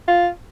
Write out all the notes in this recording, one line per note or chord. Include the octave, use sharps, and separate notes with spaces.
F4